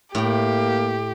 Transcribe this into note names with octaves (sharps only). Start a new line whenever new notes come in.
A2 A#3 G4 G5